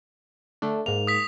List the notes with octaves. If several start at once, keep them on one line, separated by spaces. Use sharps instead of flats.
D3 A3 D4
G#2 A#3 F7
D#6 B6